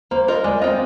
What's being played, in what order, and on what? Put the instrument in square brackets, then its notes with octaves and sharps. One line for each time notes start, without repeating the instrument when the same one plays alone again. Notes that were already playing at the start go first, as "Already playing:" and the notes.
[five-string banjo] A#3 [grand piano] C5
[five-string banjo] F4 A#4 D#5
[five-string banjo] G#3 [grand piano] D5
[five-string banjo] C4 F4 [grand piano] D#5